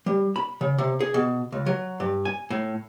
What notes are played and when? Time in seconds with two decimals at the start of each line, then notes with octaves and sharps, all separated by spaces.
0.06 G3
0.36 B5
0.61 C#3
0.78 C3
1.00 G#4
1.14 B2
1.52 C#2
1.66 F#3
2.00 G2
2.25 G#5
2.50 A2